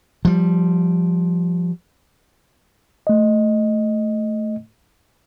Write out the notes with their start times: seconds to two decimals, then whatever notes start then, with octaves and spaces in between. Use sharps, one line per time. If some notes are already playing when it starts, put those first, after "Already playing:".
0.25 F3 G3
3.07 A3 D#5